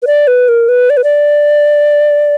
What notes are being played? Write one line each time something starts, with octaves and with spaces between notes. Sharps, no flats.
B4
D5
B4
A#4
B4
D5
B4
D5